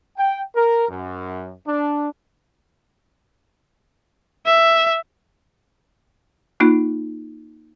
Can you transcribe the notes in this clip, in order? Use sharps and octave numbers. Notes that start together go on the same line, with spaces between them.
G5
A#4
F#2
D4
E5
A#3 D#4 F4